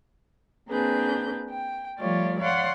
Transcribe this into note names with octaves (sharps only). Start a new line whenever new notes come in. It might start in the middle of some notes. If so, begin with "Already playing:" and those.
A#3 C4 D4 G#4 B4 G6
G5
F3 G3 A3 F4 C#5 D5
C#5 D5 F5 F#5 C6